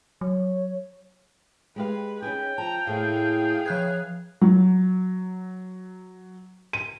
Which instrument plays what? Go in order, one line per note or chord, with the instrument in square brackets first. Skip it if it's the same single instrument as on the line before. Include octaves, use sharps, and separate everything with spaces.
[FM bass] F#3 [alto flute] C#5
[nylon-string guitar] G#3 G4 F5 [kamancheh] B4
[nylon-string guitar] C#4 D#4 G#4 [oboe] G5
[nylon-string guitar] F3 [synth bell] A5 [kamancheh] A#5
[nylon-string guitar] A2 A3 A#3 [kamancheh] G#4 F5
[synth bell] F3 F#6 G#6 [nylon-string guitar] B4 C#5
[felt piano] F#3
D#7